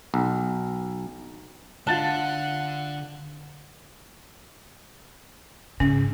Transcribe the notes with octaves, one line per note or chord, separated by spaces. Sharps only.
B1
D3 F4 F#5 A5 F#6 A6
G#2 C#3 C#4